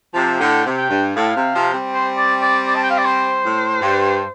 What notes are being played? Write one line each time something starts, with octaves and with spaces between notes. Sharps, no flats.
C3 F3 A5
A2 D3 G5
C3
G5
G2
A2 F5
C3
C3 F3
G3 C4
C5
D5
D5
D5
A5
G5
F5
D5
C5
A2
G2